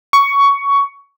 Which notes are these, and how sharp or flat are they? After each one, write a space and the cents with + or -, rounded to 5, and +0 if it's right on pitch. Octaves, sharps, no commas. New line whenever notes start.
C#6 +15